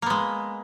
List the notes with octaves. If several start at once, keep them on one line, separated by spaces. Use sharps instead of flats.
G#3 A#3 B3